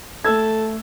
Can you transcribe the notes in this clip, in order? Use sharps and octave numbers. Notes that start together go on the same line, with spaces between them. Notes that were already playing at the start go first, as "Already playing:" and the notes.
A3 A4 E6 G#6